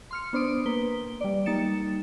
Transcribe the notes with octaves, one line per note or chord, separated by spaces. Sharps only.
C6 F6 C#7
B3 D4 C5 C6 D#6 D7
A#3 B4 G7
G3 D5
G3 A#3 D#4 A6 C#7 E7